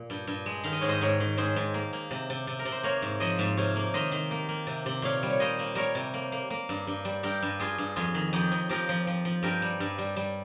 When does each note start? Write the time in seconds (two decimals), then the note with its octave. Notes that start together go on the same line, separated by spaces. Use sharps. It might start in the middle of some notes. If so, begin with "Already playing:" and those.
Already playing: A#2
0.10 G2
0.27 G2
0.46 G#3
0.64 D#3 F5
0.73 D#5
0.81 G#2 C#5
0.89 C5 D#5
1.01 G#2 A#4 C#5
1.20 D#3
1.37 G#2 G#4 C5
1.56 G#2
1.74 A#3
1.93 A#3
2.11 C3
2.30 C3
2.47 C3
2.59 A#4
2.65 C3
2.72 C5
2.83 A#3 A#4 C#5
3.02 G#2
3.20 F3 C5 D#5
3.39 G#2
3.57 C3 C#5 F5
3.76 A#3
3.94 D#3 C5 D#5
4.12 D#3
4.31 A#3
4.49 A#3
4.67 C3
4.86 C3
5.02 A#2 C#5 F5
5.23 G3
5.30 C#5
5.40 A#3 C5 D#5
5.59 A#3
5.75 G3 A#4 C#5
5.95 C3
6.14 A#3
6.32 A#3
6.50 A#3
6.69 G2
6.87 G2
7.05 G3
7.23 G2 G4 A#4
7.42 G2
7.60 G2 F4 G#4
7.78 G2
7.96 F2 F4 G#4
8.14 D#3
8.33 F2 D#4 G4
8.52 F2
8.69 F3 G4 A#4
8.89 F3
9.07 F3
9.25 F3
9.43 G2 G4 A#4
9.62 G3
9.80 G2
9.98 G3
10.16 G3